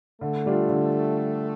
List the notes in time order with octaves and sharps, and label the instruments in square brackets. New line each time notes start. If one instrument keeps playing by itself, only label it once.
[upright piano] D3 [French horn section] A3
[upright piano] G3 D4 F4
D3